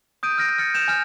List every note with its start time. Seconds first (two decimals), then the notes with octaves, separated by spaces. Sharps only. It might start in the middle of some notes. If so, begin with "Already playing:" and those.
0.23 D#6 G6 D7 D#7
0.37 E6 F6 A#6 D7
0.58 F6 A6 C#7
0.74 G6 E7 F7
0.88 G#5 F6 G6